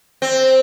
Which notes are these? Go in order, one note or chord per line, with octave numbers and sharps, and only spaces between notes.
C4